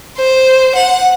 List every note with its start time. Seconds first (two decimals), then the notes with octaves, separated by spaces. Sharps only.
0.17 C5
0.75 F#5